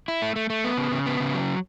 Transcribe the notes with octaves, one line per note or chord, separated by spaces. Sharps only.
E4
A3
A3
A3
B3
C#3
C#3
B3
C#3
F#3